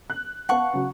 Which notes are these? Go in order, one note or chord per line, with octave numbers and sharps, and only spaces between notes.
F#6
B3 F5 F#5 A5 C#6
C#3 F#3